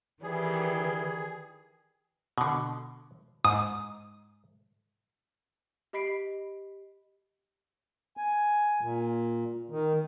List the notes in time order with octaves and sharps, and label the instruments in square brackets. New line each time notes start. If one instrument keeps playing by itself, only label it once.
[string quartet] D#3 E3 G3 [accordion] G#4
[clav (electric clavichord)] B2 D3
[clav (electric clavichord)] G#2 [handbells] D#6
[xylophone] G4 D#5 B5 B6 C7 D7
[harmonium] G#5
A#2
D#3